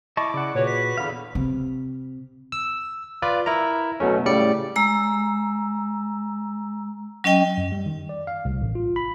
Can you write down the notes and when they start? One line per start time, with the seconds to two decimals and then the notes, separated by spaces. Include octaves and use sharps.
0.17 E4 D#5 A5 C#6 D6
0.34 C#3 D5 F#5
0.55 A#2 F#4 G#4 B4 C#5
0.67 B6
0.98 E2 D3 F5 B5
1.35 C3
2.52 E6
3.22 F4 B4 D5
3.46 E4 A#4 A#5
4.00 B2 F#3 A3 C#4
4.25 A2 C#3 G3 D5 C#7
4.76 G#3 A#5 E6
7.24 F#3 C#4 D#5 G5
7.58 F#2
7.72 G3
7.86 D#3
8.09 D5
8.27 F5
8.45 C2
8.61 A1
8.75 F4
8.96 B5